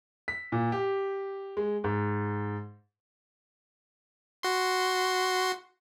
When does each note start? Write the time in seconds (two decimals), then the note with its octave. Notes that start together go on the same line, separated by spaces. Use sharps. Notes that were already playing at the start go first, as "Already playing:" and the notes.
0.28 B6
0.52 A#2
0.72 G4
1.57 G#3
1.84 G#2
4.43 F#4 C6